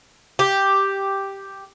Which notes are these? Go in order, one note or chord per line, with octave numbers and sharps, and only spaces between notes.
G4